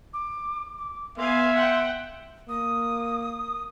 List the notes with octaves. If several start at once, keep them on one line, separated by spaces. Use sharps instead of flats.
D6
D6
B3 E5 F5 G#5 C6
F#5 G5
A#3 D#6